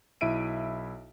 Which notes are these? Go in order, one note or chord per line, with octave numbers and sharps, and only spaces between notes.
B1 E4 E5 D7 D#7